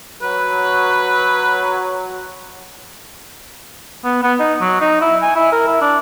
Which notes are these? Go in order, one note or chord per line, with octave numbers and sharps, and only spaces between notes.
F#3 B4
B3
B3
D#4
F#3
D#4
E4
G#5
E4
A#4
E4
D4